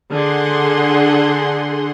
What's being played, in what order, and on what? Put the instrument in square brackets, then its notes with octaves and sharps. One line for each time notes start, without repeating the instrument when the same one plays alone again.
[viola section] D3 G#4 F#5 C6